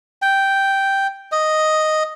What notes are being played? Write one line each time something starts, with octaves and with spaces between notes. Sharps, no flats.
G5
D#5